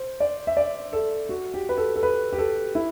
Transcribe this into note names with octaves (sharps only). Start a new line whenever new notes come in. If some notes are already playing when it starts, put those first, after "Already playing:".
Already playing: C5
D5
E5
D5
A4
F#4
G4
B4
A4
A4
B4
G4
A4
E4